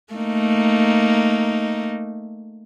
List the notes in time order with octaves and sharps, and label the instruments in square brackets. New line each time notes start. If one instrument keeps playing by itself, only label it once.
[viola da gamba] A3 A#3 D#4